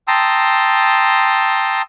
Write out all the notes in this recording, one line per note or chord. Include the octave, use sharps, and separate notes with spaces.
G5 A5 A#5 C6 D#6 E6